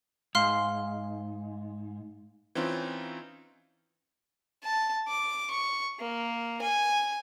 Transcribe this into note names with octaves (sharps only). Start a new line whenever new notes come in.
G#2 F5 C6 F6
E3 C4 C#4 D#4 F4
A5
D6
C#6
A#3
G#5